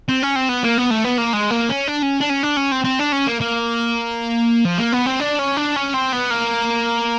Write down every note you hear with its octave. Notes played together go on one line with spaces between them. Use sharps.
C4
C#4
C4
B3
A#3
B3
A3
B3
A#3
G#3
A#3
C#4
D4
C#4
D4
C#4
D4
C#4
C4
C4
D4
C#4
A#3
A#3
F3
A#3
B3
C4
D4
C#4
D4
C#4
C4
B3
A#3